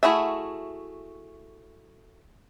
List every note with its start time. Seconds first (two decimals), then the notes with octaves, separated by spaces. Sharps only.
0.03 A3 E4 F#4 G#4 E5